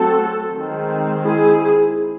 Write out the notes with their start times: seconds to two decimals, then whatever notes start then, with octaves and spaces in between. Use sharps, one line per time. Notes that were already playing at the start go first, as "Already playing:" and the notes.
Already playing: F#3 A3 C4 F#4 A4
0.54 D#3 G#3 C4
1.23 E4 G#4